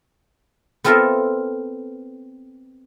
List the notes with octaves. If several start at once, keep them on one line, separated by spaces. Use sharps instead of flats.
B3 C4 F4 A4 A#4 E5